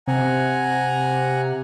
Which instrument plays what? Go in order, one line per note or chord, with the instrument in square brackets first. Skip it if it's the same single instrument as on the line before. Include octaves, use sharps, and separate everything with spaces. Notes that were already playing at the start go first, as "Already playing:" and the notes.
[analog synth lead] C3 [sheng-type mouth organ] F#5 G#5 A#5